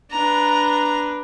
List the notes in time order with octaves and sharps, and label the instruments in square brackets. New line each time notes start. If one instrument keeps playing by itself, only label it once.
[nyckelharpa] D4 B4 [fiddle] A#5